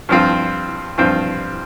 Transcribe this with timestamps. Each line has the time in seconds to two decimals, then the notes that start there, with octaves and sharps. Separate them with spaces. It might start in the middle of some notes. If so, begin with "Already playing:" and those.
0.09 G2 F3 C4 F4
0.98 G2 F3 C4 F4